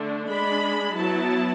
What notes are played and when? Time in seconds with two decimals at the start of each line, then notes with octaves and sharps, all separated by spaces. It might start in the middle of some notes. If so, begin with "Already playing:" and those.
Already playing: D3 A3 D4
0.28 G#3 D4 B5
0.96 F#3 B3 E4 A5